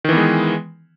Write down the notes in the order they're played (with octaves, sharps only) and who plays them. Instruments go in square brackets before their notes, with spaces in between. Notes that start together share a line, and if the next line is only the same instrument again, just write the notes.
[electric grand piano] D#3
E3
B3
G#3